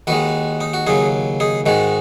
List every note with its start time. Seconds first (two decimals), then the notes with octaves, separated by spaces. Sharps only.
0.07 D#2 D#3 G#3 F#4 B4
0.61 D#4
0.74 F#4
0.87 D#2 C#3 F#3 D#4 G#4
1.40 D#4 G#4
1.66 G#2 D#3 G#3 F#4